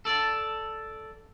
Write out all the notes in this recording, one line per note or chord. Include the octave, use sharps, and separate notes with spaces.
A4 D5